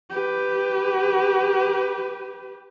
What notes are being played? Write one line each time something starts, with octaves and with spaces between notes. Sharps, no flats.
G4 B4